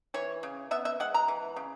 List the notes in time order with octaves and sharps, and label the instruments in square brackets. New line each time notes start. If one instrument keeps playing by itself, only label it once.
[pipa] E3 C#5
C#3
B3 E5
E5
G#3 F#5
A#5
E3
C#3